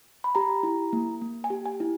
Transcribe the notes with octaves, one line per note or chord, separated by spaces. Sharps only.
B5
G4 A#5
E4
A#3
A#3
G#5
G4
G#5
E4